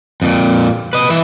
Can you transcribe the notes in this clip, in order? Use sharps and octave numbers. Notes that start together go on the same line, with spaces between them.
F2 A#2
B4 D#5
E3 E5